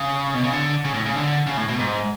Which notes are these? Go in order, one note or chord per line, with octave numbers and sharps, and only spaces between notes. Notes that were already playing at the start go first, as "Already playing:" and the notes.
Already playing: C#3
B2
C#3
D3
C#3
A2
C#3
D3
C#3
A2
B2
G#2